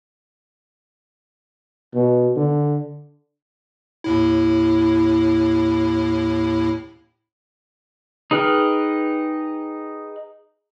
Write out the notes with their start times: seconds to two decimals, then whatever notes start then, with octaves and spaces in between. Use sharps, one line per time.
1.94 B2
2.36 D3
4.04 D#2 A2 E4
8.31 D#4 G#4 B4 G5 F6